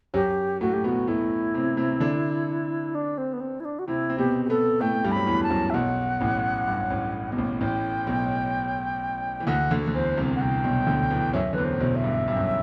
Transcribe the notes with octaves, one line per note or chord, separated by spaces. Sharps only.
F#2 F#3 G4
A2 A3 F#4
G4
B2 B3 F#4
A2 A3 E4
C3 C4
C3 C4
D3 D4
D4
C4
B3
C4
E4
D4
F#4
C3 C4 E4
C4
B2 B3 G4
G4
B2 B3 A4
A2 A3 G5
G2 G3
F#3 B5
E2 E3
A5
F#2 F#3
E5
B1 B2 F#5
A1 A2
G2
A1 A2
B2
A1 A2
A1 A2 G5
B1 B2
E3
D2 D3 F#5
D2 D3
D3
E2 E3 C5
C2 C3
F#5
C2 C3 G5
B1 B2
D2 D3
E2 E3
F#2 F#3 E5
E2 D3 E3 B4
C5
A2
B1 B2
E5
G2
G2
F#2